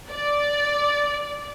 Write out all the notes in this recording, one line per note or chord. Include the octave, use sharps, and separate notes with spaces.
D5